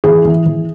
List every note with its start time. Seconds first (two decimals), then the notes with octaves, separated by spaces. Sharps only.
0.04 E3 G#4
0.25 E3
0.46 E3